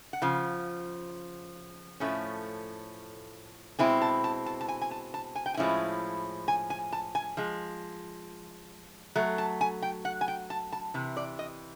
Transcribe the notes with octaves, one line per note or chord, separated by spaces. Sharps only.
F#5
C#3 F3
A2 F3 A3 C#4
B2 G#3 C4 E4 G#5
A5
A5
A5
A5
G#5
G#5
A5
A5
G#5
G5
G#5
A2 F3 G#3 C#4 E4
G#5
G#5
A5
G#5
F3 G#3
F#3 A3
A5
G#5
G5
F#5
G#5
G5
A5
A5
C3 E3
D5
D#5